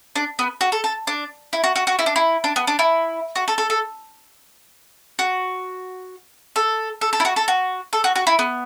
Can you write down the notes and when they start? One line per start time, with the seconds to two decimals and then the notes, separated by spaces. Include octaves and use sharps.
0.15 D4
0.39 B3
0.61 F#4
0.72 A4
0.84 A4
1.07 D4
1.53 E4
1.64 F#4
1.76 F#4
1.87 F#4
1.99 E4
2.06 D4
2.16 E4
2.44 D4
2.56 B3
2.67 D4
2.79 E4
3.35 F#4
3.48 A4
3.58 A4
3.70 A4
5.19 F#4
6.56 A4
7.01 A4
7.13 A4
7.20 E4
7.25 F#4
7.36 A4
7.48 F#4
7.93 A4
8.04 F#4
8.15 F#4
8.27 E4
8.39 B3